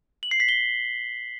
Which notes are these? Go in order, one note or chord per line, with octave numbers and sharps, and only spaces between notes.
F#7
C7
B6
G7